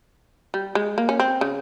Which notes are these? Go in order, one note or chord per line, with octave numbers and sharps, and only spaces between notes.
G3
G#3
A#3
C#4
C4
C#3